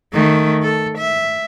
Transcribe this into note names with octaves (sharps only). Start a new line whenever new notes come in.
D#3 A3
A4
E5